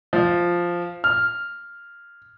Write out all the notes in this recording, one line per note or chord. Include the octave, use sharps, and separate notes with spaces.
F3
F6